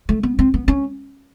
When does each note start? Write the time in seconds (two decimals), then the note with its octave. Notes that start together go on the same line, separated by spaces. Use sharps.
0.09 A3
0.23 B3
0.39 C4
0.54 B3
0.68 C#4